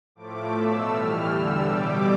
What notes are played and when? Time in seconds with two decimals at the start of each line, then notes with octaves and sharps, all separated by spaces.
0.15 A2 F3 A3 D6
0.53 B2 A3 E6
0.89 A2 E3 G3 F6
1.26 E2 D3 G3 E6
1.64 B2 G3 D6